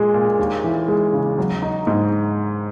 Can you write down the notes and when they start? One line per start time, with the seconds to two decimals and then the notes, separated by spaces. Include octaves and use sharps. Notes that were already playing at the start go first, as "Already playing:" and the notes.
Already playing: A#2 G#3
0.14 A#2
0.39 D#2
0.64 E3
0.88 G#3
1.13 C#3
1.38 F#3
1.62 D#4
1.87 G#2